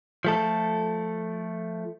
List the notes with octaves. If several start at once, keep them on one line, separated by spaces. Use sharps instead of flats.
F3 A3 A4